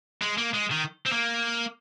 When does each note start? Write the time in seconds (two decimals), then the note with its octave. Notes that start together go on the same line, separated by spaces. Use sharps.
0.22 G#3
0.38 A#3
0.54 G#3
0.71 D#3
1.06 C4
1.12 A#3